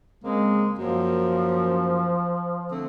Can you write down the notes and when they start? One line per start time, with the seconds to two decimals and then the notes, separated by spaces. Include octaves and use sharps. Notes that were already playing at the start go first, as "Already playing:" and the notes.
0.24 C#3 G#3 A#3 C4
0.79 F#2 F3 A#3
2.71 D3 A3 C4